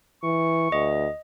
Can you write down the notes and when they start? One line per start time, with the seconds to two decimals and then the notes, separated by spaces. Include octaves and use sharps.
0.23 E3 C#6
0.72 D2 D#5